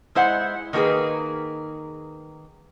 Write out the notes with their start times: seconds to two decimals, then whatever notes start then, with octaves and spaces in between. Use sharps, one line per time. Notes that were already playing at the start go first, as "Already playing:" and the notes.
0.15 G#3 E4 C5 F#5
0.73 D#3 A#3 B3 G#4 B4